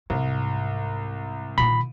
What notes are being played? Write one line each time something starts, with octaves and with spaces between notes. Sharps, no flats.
C2 G#2
A#2 D#3 B5